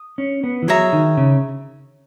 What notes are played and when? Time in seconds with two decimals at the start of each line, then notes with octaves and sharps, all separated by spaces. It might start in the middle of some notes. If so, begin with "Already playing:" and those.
Already playing: D#6
0.18 C#4
0.44 B3
0.62 E3
0.68 F#3 G#4 C#5 E5 A#5
0.93 D#3
1.17 C#3